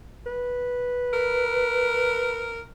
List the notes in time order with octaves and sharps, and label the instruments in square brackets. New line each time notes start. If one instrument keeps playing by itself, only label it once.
[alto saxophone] B4
[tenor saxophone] A#4